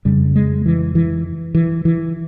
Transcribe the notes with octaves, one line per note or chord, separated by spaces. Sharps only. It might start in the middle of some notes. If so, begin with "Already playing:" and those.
F2 C#3 G3
G#3
E3
E3
E3
E3